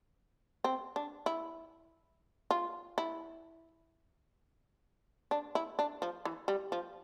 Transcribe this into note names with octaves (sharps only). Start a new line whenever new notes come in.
C4
D4
E4
F4
E4
D4
E4
D4
F3
E3
G3
F3